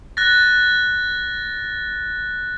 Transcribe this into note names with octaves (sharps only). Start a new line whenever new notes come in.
F#6 A6 A#6